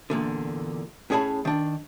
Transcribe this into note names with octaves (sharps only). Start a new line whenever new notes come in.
E2 A#2 D3
A2 C#4 G#4 C#5 A5 B5
D#3 D4